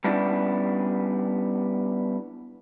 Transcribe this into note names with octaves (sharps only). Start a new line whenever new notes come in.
G3 B3 C#4 D4 E4